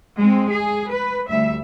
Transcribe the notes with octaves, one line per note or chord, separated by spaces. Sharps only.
G#3 C4
G#4
B4
D2 G3 E5